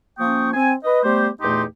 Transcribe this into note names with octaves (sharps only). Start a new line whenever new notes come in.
F3 A#3 C#4 G5 C#6 D#6
C4 G#5
B4 D#5
G3 A3 B3 G4 C5
E2 A#2 A3 D#4 G4 C6